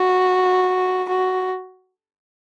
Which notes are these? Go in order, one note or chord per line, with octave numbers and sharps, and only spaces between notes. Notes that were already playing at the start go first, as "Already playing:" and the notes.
Already playing: F#4
F#4